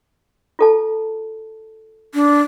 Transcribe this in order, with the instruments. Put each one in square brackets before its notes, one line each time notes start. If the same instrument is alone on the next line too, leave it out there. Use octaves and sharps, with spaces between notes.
[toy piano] F4 A4 A5
[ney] D4